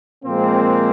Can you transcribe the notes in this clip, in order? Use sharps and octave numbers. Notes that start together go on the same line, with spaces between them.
A#2 F3 G#3 A#3 C4